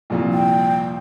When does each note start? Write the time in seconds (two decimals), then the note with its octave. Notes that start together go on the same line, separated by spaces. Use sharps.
0.10 C2 F2 A#2
0.33 G5